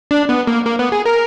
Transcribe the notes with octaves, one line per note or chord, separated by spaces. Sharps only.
D4
B3
A#3
A#3
B3
G#4
A#4